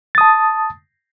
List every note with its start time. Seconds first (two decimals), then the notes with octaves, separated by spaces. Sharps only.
0.15 A6
0.18 D#6
0.21 A5